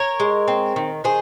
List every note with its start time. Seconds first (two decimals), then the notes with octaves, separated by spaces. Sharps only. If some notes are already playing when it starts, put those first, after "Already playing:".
Already playing: A#4 C#5
0.20 G#3
0.48 C4
0.76 D#3
1.04 D#3 G#4 C5